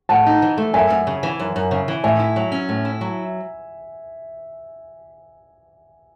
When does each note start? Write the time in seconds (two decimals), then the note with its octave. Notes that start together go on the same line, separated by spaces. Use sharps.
0.09 A2 F#5 A5
0.26 D#4
0.42 E3
0.58 A3
0.74 F#2 E5 G#5
0.90 F#2
1.07 C#3
1.23 E3
1.40 F#2
1.56 F#2
1.71 C#3
1.88 E3
2.04 A2 E5 G#5
2.20 E4
2.36 F#3
2.52 C#4
2.69 A2
2.85 E4
3.01 F#3